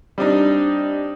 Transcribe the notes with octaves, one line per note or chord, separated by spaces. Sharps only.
G3 C4 D4 D#4